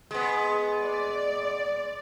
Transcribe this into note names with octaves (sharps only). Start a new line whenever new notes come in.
G#3 B3
D5